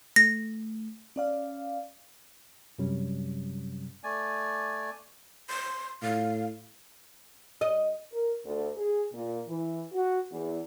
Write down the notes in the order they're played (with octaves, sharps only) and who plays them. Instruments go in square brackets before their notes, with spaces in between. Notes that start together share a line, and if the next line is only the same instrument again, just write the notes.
[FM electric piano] A3 [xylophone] A#6
[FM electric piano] C#4 D5 F5
[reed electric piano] F#2 C3 F#3 G3 C#4
[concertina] A3 D5 G#5
[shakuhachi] C6
[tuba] A2 [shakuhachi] F5
[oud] D#5
[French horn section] A#4
D2
G#4
A#2
E3
F#4
E2